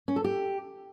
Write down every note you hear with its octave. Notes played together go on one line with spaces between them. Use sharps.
C#4
A4
G4